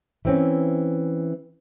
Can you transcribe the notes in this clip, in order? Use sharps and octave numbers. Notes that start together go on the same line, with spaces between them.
E3 C4 C#4